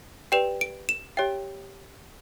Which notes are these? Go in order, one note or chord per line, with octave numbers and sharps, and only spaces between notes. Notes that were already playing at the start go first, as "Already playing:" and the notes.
G4 B4 D5 G5 E7
D7
E7
G4 C#5 E5 G5